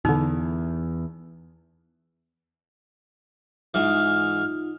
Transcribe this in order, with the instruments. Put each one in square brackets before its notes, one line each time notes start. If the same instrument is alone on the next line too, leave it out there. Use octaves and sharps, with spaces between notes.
[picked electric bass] E2 [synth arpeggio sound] B2 D3 [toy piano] D#4
[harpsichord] G#2 E3 [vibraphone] D#4 F4 [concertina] F6